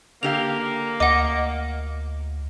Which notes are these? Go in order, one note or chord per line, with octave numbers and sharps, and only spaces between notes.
D3 A#3 G4 F5 F7
D2 D#5 F#5 D6